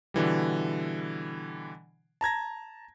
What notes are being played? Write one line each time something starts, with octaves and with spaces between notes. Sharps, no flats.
B2 D3 E3 G3
A5 A#5 G#6 A#6